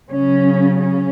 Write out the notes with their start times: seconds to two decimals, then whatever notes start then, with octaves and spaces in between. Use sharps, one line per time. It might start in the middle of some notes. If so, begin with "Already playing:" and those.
0.10 C#3 F#3 C#4
0.80 C#4